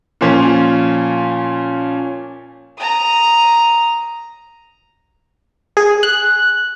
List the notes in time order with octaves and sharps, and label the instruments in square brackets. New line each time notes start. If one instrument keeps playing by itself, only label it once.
[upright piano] A#2 F3 C#4 F4
[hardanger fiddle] A#5 D#6
[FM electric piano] G#4
F#6